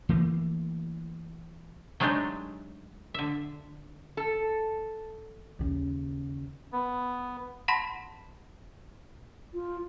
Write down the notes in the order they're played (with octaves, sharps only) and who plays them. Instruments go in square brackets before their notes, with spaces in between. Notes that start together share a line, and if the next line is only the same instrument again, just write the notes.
[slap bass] E3 A3 A#3
[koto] F#3 G#3 A3 D4 D#4 G4
D3 E5
[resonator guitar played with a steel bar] A4
[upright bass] D#2 C#3
[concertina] B3
[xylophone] F#5 A5 B5 C6 A#6 B6
[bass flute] F4